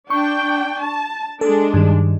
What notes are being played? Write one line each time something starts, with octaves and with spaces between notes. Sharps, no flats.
D4 G5 C#6
A5
G#3 D4 A4
G2 D#3